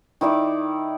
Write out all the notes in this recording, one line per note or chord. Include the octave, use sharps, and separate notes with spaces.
D#3 E4 D5 D6